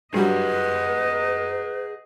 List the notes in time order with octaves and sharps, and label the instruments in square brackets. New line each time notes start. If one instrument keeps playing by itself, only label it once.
[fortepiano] G2 F#3 G3 [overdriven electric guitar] G#4 F#5 [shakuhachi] B4 [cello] D#5